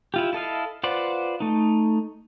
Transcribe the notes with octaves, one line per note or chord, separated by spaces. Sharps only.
E4 F4 G4
E4 A4 D#5 F5
F4 B4 C5 D5 F#5
A3 D#4